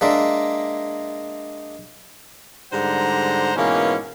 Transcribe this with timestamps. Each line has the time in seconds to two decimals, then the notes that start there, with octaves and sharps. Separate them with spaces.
0.01 G#3 A#3 D4 E5
2.72 G#2 D3 G3 C5 F#5 A#5
3.56 G#2 B2 E3 A#3 C#4